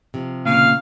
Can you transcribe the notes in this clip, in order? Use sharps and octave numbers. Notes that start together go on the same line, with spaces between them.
C3 F3
D#2 A#2 C#3 F5